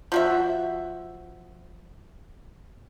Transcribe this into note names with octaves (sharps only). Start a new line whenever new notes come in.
F3 F#4 E5